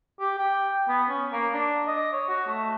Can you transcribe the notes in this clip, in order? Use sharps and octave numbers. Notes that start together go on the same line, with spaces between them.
G4
G5
B3
C#4
A#3
D4
D#5
C#5
F#4
A3